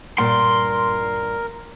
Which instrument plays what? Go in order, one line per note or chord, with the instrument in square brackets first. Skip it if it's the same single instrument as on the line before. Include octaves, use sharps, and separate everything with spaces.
[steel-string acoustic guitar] G2 A#2 D5 [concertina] A#4 [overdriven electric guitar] C6